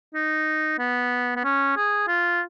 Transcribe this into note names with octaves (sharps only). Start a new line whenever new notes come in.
D#4
B3
B3
C#4
G#4
F4